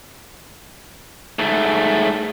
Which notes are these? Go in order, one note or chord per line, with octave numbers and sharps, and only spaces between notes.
G#2 A3